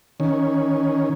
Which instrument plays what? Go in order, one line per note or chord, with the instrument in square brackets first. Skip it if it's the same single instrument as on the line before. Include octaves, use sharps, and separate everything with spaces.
[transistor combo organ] D#3 C#4